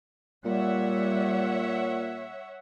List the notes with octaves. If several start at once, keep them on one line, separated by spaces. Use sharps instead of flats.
A#2 G3 C#5 E5 F#5